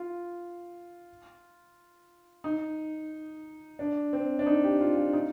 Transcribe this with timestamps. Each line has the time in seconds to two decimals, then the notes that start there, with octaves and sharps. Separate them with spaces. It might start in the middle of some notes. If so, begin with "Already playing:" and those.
Already playing: F4
2.44 D#4
3.79 D4
4.13 C4
4.39 D4
4.46 D#4
4.64 G4
4.80 F4
4.97 F4
5.13 D#4